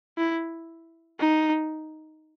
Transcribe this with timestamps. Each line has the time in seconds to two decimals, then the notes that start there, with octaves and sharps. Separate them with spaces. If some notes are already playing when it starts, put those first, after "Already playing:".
0.18 E4
1.20 D#4